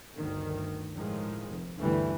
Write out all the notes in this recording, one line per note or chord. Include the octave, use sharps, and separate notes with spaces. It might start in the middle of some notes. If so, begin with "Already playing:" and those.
G1 D2 D#3
A2 D#3 F3 G#3
F1
G1 D2 D3 E3 G3 A3